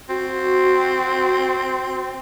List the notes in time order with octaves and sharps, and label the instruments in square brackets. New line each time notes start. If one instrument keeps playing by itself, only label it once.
[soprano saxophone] C4 [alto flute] F#4